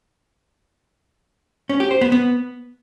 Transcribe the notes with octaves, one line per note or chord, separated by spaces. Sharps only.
C#4
G4
C5
B3
B3